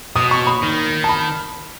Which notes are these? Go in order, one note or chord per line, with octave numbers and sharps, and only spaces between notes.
B2 D#6
C#6
B5
D#3
A5
B5